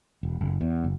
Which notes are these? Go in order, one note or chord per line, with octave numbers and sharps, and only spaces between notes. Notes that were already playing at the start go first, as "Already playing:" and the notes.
E1
F#1
E2
F#1